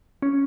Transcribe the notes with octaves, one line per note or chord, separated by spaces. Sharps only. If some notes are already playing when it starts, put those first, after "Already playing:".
C#4